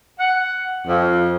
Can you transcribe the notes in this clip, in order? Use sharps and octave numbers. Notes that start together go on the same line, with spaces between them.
F#5
F2